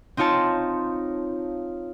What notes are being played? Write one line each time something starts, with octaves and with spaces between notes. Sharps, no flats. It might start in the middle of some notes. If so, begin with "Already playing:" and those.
C4 D#4 F4 C#5 A5